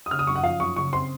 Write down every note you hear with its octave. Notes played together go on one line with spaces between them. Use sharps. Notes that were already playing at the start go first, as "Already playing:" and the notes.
D#6
C#3 F6
D#6
F#2 C#6
F#5
F3 F5
F#2 C#6
C#3 C#6
C4 C6